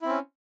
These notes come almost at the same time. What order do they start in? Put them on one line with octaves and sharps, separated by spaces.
E4 C4 C#4